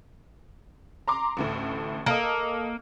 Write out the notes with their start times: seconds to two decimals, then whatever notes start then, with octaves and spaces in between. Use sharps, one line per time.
1.08 A#5 C6 D6
1.37 A1 D2 A2
2.06 A#3 A4 D#5